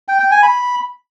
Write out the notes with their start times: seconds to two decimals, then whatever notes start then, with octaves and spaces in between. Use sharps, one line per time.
0.08 G5
0.20 G5
0.31 G#5
0.43 B5